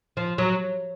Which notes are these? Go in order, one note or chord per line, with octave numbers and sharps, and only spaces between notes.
F3
F#3